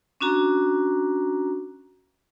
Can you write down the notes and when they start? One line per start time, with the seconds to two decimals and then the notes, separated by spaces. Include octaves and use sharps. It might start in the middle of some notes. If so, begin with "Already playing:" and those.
0.21 C#4 D4 F#4 A#5